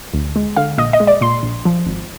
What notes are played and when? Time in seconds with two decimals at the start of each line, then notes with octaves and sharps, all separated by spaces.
0.14 D2
0.36 G#3
0.56 D3 F5
0.78 A#1 D#5
0.93 D#5
1.00 G#3
1.07 D5
1.21 A#2 C6
1.43 A#1
1.65 F3
1.86 G#1